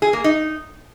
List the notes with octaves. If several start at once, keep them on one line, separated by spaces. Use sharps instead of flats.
G#4
A#3
D#4